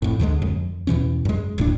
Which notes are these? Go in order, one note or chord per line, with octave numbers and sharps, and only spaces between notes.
F2 A2
D2 D3 E3 G#3
F2
E2 B2 E3 C#4
F#2 G#3
D#1 A2 D4